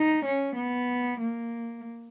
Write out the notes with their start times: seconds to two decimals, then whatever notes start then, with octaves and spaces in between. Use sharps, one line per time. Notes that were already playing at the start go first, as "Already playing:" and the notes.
Already playing: D#4
0.25 C#4
0.56 B3
1.21 A#3